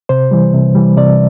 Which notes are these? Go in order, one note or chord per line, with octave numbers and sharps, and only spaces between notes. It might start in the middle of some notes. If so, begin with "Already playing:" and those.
C3 C5
E3 G3
C3
E3 G3
C3 D5